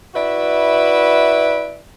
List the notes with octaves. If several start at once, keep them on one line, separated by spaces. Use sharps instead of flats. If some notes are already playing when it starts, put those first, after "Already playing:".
E4 F#4 B4 D5 E5